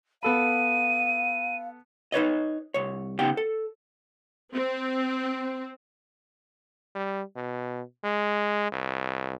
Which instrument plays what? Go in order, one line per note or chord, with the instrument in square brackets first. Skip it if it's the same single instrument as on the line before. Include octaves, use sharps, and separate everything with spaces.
[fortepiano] B3 A4 B5 [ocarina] F5 [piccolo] D#7
[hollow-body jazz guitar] D#4 B4 C#5 D#5
C2 C#5
C#3 B3 D#4 G4 F#5 G5
A4
[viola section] C4
[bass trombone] G3
B2
G#3
C2